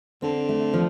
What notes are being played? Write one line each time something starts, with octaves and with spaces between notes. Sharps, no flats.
D3 C4
A3
F3